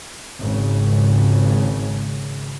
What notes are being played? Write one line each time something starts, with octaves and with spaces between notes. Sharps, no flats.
G#1 C#3